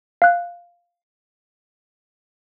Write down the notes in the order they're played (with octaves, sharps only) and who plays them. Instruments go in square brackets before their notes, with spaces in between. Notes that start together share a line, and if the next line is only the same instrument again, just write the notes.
[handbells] F5 F#6